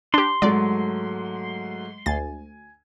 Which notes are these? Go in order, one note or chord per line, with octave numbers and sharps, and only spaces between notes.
D4 G4 C6
G#2 F#3 G#3 A3 D5
D2 G#5 A6